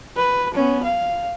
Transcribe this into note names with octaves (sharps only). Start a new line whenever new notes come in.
B4
B3 C#4
F5